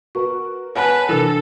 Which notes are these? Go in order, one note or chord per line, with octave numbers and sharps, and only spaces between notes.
F#4 A#4 B4 C#6
B4 C#5 F#5 G#5 A5 B5
C3 E3 D4 A4 A#4 E6 E7